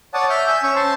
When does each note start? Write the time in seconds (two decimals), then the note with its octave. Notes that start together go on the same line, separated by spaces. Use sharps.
0.14 C#5 D5 F#5 A5 D#6
0.30 E5 F6 G6
0.47 G#5 E6 G6
0.63 C#4 C#6 E6
0.76 C5 A5 C6